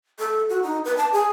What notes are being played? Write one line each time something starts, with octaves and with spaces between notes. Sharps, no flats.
A4
F#4
D#4
B4
A5
G#4